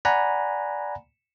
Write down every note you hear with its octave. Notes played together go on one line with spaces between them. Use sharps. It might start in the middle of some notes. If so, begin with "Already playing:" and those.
D5 F#5 G#5 A#5 B5